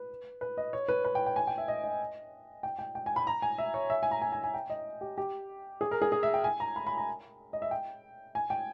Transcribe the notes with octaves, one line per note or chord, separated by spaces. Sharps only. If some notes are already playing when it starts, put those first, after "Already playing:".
Already playing: B4
B4
D#5
C#5
B4
B4
G5
G5
G#5
G5
E5
D#5
D#5
G5
G5
G5
G#5
B5
A#5
G#5
E5
C#5
E5
G#5
A#5
G#5
G#5
G#5
G5
D#5
G4
G4
G#4
A#4
G#4
G#4
E5
G5
G#5
A#5
B5
B5
A#5
D#5
E5
G5
G#5
G5